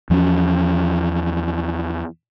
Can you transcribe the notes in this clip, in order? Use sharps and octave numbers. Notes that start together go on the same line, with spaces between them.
E2 F3 C4 C#4